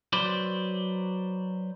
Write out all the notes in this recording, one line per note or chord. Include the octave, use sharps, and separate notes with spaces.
F#3 B4 C5 D5